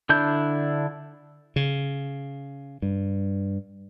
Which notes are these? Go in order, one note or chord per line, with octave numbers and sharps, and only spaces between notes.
D3 D4 E4 G6
C#3
G2